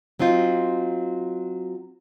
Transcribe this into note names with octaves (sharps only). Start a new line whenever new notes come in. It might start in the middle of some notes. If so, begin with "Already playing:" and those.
F#3 C4 D#4 F4